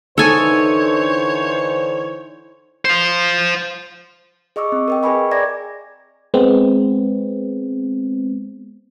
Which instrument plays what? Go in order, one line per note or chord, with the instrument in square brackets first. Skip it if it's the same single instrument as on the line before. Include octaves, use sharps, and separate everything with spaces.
[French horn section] D3 E3 C5 [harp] D#4 [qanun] A4 G#5 [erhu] C#5
[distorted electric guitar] C5 F5
[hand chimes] G#4 D#5 C#6 D6 E6
C4
A#4 D#5 G5
G#4 B4 G5 G#5 B5 C#6
D5 E5 A#5 D6 G#6 A#6
[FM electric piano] G#3 B3 C4